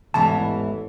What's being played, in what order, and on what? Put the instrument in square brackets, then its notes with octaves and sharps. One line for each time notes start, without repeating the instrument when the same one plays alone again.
[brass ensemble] A1 [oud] E2 G#2 E3 [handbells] A5